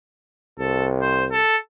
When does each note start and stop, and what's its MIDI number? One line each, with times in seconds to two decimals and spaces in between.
0.59 1.42 36
0.59 0.86 69
1.01 1.25 72
1.32 1.56 69